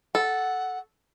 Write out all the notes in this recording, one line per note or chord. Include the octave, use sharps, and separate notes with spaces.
A4 F#5